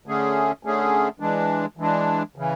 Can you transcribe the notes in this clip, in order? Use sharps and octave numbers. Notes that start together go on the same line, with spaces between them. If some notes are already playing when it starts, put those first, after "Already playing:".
D3 A3 C#4 G#4
D3 A3 C#4 G#4
E3 G#3 D4
E3 G#3 D4
C#3 E3